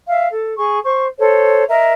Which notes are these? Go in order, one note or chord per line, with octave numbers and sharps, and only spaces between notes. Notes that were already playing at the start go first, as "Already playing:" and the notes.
E5 F5
A4
G#4 C#6
C5 C#6
A4 C5 C#5
A#4 D#5 E5